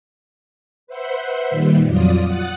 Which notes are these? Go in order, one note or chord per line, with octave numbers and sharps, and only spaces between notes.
B4 C5 E5 F#5 C6
A#2 D#3 G3
F2 F#3 F4 D5 D#6
F#5 D#6 F#6 A6